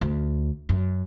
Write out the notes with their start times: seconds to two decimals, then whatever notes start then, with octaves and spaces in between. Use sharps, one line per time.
0.01 D2
0.69 F#2